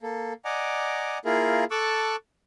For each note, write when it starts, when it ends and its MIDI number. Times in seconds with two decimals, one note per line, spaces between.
0.03 0.33 58
0.03 0.33 69
0.45 1.18 74
0.45 1.18 75
0.45 1.18 78
0.45 1.18 80
0.45 1.18 82
0.45 1.18 86
1.25 1.64 58
1.25 1.64 64
1.25 1.64 65
1.25 1.64 68
1.25 1.64 70
1.71 2.16 69
1.71 2.16 81
1.71 2.16 85
1.71 2.16 86
1.71 2.16 88
1.71 2.16 90